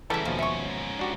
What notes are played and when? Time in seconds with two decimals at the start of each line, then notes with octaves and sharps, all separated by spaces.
0.10 G#2 C#3 E3 G3 C#4 A4 E5
0.25 D#2 B2 F3
0.39 E5 C#6
0.99 D4 F#4 G4